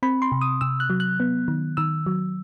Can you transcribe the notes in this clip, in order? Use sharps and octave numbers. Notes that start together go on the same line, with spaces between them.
C4 B5
C6
C3
D#6
C3 E6
F#6
F#3
F#6
B3
D#3
D#3 E6
F#3